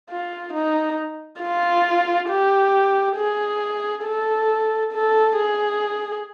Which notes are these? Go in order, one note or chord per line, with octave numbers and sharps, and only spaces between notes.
F4
D#4
F4
G4
G#4
A4
A4
G#4